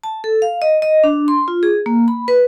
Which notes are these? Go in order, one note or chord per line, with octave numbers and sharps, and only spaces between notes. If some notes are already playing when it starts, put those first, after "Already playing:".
A5
A4
F5
D#5
D#5
D4
C6
F4
G#4
A#3
B5
B4